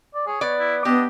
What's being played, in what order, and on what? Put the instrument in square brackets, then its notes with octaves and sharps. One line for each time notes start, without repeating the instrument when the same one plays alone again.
[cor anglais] D5
[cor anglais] G#4 [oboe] C#5
[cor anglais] B3 [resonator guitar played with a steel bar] D5
[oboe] E4
[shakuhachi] B3 [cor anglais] D4 [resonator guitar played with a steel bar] G4 [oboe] D#5